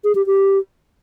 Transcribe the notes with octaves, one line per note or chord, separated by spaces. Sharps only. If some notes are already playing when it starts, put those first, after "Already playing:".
G#4
G4
G4